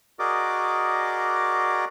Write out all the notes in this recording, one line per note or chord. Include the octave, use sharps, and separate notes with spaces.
F#4 G#4 A#4 D5 D#5 D6